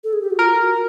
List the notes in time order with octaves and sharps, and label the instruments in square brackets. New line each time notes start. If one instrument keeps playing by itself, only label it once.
[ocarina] A4
G#4
G4
F#4
[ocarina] F4 [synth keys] A#4
[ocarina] F#4